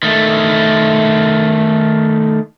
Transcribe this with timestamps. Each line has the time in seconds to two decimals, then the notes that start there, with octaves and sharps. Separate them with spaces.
0.03 D#3 A3